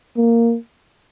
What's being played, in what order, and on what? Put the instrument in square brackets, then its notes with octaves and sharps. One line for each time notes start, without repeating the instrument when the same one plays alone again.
[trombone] A#3